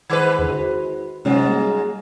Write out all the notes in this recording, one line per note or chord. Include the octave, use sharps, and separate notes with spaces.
D#3 G#3 B4 C5 D6 G#6
E2 D3
F#4 C5
G#2 C3 F#3 G#3 C#4 F4
G3 A#3